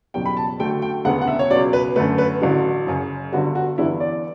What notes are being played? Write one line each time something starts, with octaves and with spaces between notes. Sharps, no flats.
F#1 E2 B2 G3 G5
B5
A5
D2 D3 F#3 A3 G5
G5
E1 D2 C#3 G3 B3 F#5
F#5
E5
C#5
C#2 B2 F#3 D5
B4
F#2 D3 A3 B4
B4
A1 G2 D3 F#3
F#1 F#2 C#3
G1 G2 D3 G3 B3 F#4
F#4
G1 G2 E3 G3 B3 E4
D5